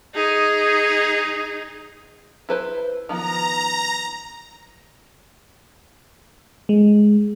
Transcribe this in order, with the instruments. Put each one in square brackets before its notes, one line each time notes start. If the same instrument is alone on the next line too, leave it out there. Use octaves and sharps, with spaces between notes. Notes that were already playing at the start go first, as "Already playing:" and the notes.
[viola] D#4 G#4
[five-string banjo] E4 B4 C5
[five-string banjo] D#3 F3 B3 [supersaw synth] A#5
[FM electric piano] G#3